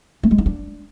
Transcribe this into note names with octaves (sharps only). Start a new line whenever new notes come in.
A3
G#3
D#4
D4